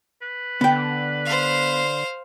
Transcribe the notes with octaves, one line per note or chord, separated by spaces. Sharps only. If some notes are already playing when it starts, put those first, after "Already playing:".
B4
D3 B3 G5
C5 F5